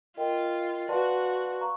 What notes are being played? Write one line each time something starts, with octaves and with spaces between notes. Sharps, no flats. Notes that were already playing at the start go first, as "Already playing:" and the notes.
F4 A#4 D#5 G5
F#4 B4 D5 F5 A5 C6
F5 A#5 C#6